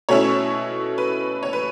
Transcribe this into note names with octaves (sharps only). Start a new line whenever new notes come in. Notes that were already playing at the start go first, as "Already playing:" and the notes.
B2 A3 C#4 E4 C#5
B4
C#5
B4